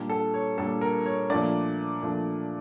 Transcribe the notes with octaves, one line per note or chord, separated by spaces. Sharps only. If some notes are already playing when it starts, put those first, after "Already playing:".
Already playing: A#2 G3 D4
A4
C#5
A#2 G3 D4 A4
A#4
C#5
A#2 F3 A3 D4 D5
A#2 F3 A3 D4